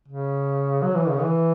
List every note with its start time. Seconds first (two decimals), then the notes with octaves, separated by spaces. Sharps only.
0.08 C#3
0.83 F#3
0.96 E3
1.09 C#3
1.21 E3